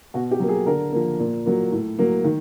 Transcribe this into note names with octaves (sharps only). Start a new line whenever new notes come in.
B2 F#4
G4
F#3 A#3
G#4
D3 A#4
F3 A#3
A#2
F#3 A#3
A2
F#3 A#3
D#3